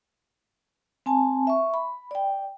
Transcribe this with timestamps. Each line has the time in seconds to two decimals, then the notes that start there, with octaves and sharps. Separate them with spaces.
1.06 C4 G#5 A5
1.47 E5 C#6
1.74 B5
2.11 D5 G5